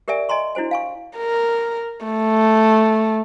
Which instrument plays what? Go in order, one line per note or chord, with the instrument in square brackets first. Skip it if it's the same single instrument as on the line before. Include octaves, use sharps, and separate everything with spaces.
[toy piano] G4 A#4 D5 E5 G#5
D#5 G#5 A#5 C6 C#6
D4 E4 F#4 C5 G#5
F5 G#5 C#6
[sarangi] A#4
A3